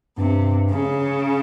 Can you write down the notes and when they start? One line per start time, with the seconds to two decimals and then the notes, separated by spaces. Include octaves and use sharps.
0.17 G2 C3
0.69 C#3